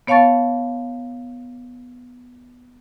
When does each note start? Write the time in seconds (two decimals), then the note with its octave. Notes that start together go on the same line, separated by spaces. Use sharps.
0.07 B3 C#5 F5 A5 C#6 A6